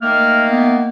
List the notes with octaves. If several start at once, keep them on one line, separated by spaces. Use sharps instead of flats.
D#3 A3 A#3 F6
B3